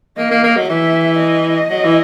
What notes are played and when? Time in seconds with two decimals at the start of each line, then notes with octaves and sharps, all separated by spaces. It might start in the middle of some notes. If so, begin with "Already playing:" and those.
0.18 A#3 D#5
0.31 A#3
0.44 A#3
0.57 F#3
0.69 E3 E5
1.20 D#5
1.70 F#3
1.84 E3